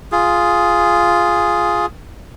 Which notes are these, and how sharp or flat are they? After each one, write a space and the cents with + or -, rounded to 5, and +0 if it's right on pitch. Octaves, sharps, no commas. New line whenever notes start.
F4 +0 G#4 +0